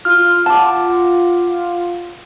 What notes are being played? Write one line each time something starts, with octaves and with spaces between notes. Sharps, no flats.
F4 F6
F#5 A5 D6